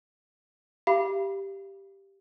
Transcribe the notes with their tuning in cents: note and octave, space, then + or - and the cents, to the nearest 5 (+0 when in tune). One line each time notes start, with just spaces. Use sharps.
G4 +0 F5 -35 B5 -25